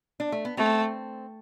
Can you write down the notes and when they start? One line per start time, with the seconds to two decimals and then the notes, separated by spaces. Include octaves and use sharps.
0.20 D4
0.32 A3
0.45 B3
0.57 A3 C4